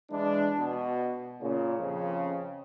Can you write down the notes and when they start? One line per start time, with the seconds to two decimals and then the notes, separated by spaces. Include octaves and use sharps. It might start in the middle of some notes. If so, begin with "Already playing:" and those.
0.10 E3 G#3 D4
0.59 B2
1.41 A#2 C#3
1.79 F2 C#3